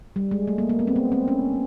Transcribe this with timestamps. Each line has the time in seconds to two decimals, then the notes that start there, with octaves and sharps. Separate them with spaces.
0.16 G3
0.31 G#3
0.48 A3
0.58 A#3
0.69 A#3
0.79 B3
0.87 C4
0.96 B3
1.12 C4
1.28 C#4